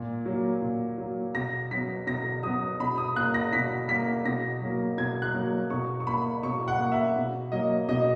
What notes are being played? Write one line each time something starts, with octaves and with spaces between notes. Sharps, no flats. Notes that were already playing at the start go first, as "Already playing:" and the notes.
Already playing: A#2
F#3 A#3
A#2
F#3 A#3
B2 A#6
F#3 B3 B6
B2 A#6
F#3 B3 D#6
B2 B5
D#6
A#3 F#6
A#6
B2 B6
A#3 B6
B2 A#6
F#3 A#3
B2 G#6
F#6
F#3 A#3
B2 C#6
C#6
A#3 B5
B2 C#6
F#5
A#3
E5
B2
F#3 A#3 D#5
B2 D#5